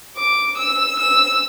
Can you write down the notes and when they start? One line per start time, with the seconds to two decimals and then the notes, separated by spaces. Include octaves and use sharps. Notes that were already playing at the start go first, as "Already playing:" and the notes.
0.16 D6
0.57 E6
0.99 E6